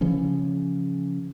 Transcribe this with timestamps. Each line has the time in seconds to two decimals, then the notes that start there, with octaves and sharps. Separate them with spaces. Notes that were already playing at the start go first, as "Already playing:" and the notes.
0.01 C#3 E3 F3 C#4